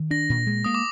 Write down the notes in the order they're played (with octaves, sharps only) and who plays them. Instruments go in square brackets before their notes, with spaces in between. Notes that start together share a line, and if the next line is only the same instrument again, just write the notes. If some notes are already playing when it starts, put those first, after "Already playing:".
Already playing: [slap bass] D#3
[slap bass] D4 [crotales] A#6
[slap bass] A#2
G#3
[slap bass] A#3 [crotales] D#6
[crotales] D6